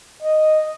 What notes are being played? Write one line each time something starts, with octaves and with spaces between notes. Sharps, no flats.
D#5